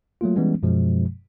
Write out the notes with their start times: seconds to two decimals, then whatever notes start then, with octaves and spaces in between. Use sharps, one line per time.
0.21 F#3 A3 A#3 F4
0.36 E3 G3 G#3 B3 C#4
0.63 F#2 B2 F3 G#3